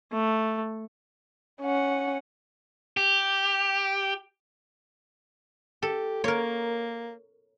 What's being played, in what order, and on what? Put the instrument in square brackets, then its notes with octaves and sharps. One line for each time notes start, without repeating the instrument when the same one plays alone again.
[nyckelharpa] A3
[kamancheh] C#4 F#5
[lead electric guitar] G4
[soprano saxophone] G4 [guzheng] A4
[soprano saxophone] A#3 [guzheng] A#4 C#5